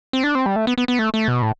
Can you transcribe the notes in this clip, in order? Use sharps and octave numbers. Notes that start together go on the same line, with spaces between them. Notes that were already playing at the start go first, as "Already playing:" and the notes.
C4
D4
C4
G3
A3
B3
B3
B3
A3
A3
B2
A2